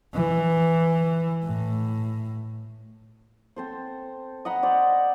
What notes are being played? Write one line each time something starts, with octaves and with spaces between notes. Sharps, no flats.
E3
A2
C4 A4 C5
D#5 F#5 A#5 B5
C5 D5 D#5